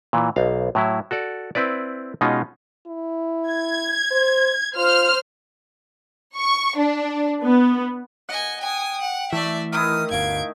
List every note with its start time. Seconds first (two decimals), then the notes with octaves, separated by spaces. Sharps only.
0.13 A#2 E3
0.36 B1 F5
0.75 A2 F#3 E4
1.11 F#4 A4 D5
1.55 C4 E4 B4 D5
2.21 B2 G#3 C#4 D#4 F4
2.87 E4
3.51 G#6
4.11 C5
4.76 F4 C5 F6
6.36 C#6
6.77 D4
7.43 B3
8.29 D#5 F#5 G#5
8.61 G5 G#5 D#6
9.01 F#5
9.33 E3 A3 D5 E5
9.72 D#3 D#4 E4 D#6 F6
10.11 G1 D2 F5 G#6 D7